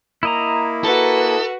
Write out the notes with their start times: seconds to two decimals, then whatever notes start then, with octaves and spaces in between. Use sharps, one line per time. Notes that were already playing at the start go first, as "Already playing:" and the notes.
0.23 A#3 E4 D#5 A#5
0.84 F#4 A4 B4